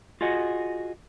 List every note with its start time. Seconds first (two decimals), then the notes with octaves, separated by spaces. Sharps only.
0.21 F4 F#4 G#4 D#5 F#5